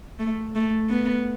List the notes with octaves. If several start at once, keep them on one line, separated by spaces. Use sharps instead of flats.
A3
A3
B3